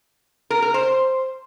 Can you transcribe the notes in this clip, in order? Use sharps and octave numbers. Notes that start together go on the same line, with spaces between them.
A#4
A#4
C5